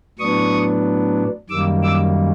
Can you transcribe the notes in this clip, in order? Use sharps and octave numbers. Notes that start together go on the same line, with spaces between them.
A2 F#3 B3 D4 C#6 D#6
F#2 D#3 G3 A#3 D6 E6
D6 E6